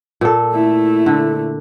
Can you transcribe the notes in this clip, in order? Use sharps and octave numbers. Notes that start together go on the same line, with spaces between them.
A#2 A4
A3 E4
D3